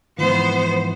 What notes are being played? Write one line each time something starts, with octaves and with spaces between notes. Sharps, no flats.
G#2 E3 F3 B3 C5